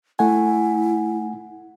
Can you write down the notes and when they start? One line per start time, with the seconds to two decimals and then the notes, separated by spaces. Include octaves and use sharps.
0.19 A3 E4 F#5 G#5